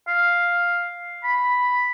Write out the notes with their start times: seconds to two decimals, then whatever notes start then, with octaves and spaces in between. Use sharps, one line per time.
0.08 F5
1.24 B5